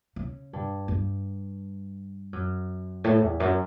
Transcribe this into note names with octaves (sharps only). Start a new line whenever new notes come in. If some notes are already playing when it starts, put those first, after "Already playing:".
C#3
G2
G2
F#2
A2
E2
F#2